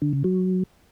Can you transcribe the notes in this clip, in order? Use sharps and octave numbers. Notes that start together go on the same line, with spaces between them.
D3
C#3
F#3